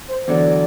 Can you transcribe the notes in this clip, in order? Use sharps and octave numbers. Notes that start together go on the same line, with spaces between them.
C5
E2 D3 F#3 D5